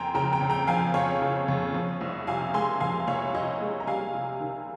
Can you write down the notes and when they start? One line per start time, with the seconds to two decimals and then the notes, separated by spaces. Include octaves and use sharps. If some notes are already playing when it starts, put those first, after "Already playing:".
Already playing: F2 G5 G#5 A#5 C6
0.14 C#3 G5 A#5
0.33 G5 A#5
0.41 F2
0.50 G5 A#5
0.67 F3 F5 G#5
0.94 F2 C#5 F5
1.22 C#3
1.48 F2
1.74 F3
2.01 C2
2.27 C3 F5 G#5
2.54 G#3 G#5 C6
2.80 F3 F5 G#5
3.07 C2 C#5 F5
3.35 C3 D#5
3.61 G#3
3.80 A#5
3.87 G3 F5 G#5
4.14 C3
4.40 D#3